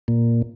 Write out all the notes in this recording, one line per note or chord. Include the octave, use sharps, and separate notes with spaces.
A#2